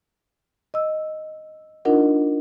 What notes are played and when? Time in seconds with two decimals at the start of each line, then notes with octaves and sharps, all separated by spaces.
0.74 D#5 E6
1.85 D4 D#4 F4 A#4 D#5 F#5